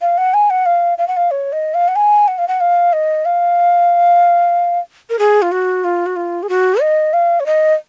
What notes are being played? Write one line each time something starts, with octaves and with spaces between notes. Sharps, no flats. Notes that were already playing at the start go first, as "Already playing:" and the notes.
F5
F#5
G#5
F#5
F5
F5
F#5
F5
C#5
D#5
F5
F#5
G#5
F#5
F5
F#5
F5
D#5
F5
A#4
G#4
F4
F#4
F4
F#4
F4
G#4
F#4
D#5
F5
C#5
D#5